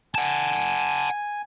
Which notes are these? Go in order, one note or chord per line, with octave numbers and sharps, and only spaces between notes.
F#5 G#5 A5